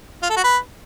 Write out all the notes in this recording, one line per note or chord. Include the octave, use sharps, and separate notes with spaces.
F4
A4
F#4
B4